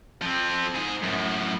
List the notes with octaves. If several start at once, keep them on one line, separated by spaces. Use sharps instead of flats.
F3 C4
G#2 G#4
F#2 A2